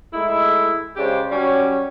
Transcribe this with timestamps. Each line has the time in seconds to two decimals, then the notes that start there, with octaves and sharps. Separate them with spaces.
0.13 G#3 A3 D#4 E4
0.96 C#3 G#3 D4 G4 C5 C#5
1.31 F#3 G3 C#4